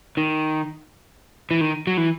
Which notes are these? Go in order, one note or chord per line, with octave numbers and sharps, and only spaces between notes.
D#3
E3
D#3
F#3
E3